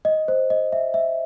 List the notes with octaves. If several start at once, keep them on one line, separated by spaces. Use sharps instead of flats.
D#5
C5
D#5
E5
E5